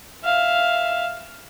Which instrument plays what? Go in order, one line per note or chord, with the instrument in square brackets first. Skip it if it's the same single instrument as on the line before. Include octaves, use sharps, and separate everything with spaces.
[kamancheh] E5 F5